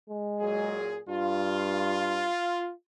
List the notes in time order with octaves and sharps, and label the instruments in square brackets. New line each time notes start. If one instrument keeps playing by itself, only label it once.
[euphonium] G#3
[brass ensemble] A#2 F#3 G#4
[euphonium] G2 [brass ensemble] F4